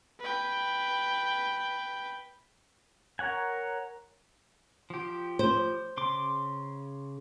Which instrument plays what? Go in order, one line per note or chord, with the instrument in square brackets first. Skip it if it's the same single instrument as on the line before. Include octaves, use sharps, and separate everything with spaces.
[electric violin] B4 G5
[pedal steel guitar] A#4 C#5 F#5 G#5
F3 G4
[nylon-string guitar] C5
[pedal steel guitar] C#3 C6 D6